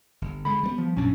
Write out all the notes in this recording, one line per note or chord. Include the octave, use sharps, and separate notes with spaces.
G1
D3 G#3 B5
G3 A3 B3
F3
A#1 F#2 A#2 C#4 D4